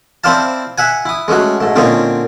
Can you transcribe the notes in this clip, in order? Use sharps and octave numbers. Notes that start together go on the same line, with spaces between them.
C4 E4 C5 D5 F5 A5
E5 F#5 G#5
E4 D#6
G#3 A3 C#4 F#4
G#2 A3
A#2 D3 C4 C#4 D#4